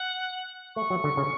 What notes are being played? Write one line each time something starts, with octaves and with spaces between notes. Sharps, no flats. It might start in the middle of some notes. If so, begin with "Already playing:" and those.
Already playing: F#5
A3 C#6
F#3
D3
C#3